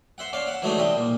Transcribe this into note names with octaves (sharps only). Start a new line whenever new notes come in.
C5 E5 F#5
C#4 D5 F5
E5 F#5
E3 F#3 G#3 A3 D4 D#4
C3 G3 D#5 E5
A#2